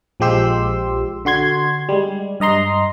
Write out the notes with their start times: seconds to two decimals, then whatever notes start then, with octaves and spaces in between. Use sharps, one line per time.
0.20 A#1 F3 G#3 G4 C6 E6
1.25 D3 F#4 C6 G#6
1.89 G3 G#3
2.40 G2 D#5 A#5 C6